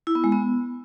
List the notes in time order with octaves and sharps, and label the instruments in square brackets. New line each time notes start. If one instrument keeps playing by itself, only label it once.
[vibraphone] E4
B3
G#3
B3